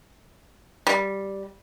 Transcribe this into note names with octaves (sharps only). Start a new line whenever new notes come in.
G3